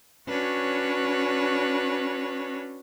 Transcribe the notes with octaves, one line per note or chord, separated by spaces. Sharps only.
C#4 D4 F#4 B4 C#5